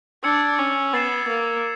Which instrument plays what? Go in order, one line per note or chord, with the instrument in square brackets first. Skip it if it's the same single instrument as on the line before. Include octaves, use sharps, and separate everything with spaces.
[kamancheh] D4 [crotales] E6 G#6 C#7
[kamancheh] C#4
[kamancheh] B3 [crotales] A6 C7 E7
[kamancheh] A#3